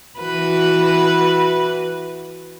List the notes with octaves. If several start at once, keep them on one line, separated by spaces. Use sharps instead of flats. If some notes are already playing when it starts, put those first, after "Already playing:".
E3 F#4 B4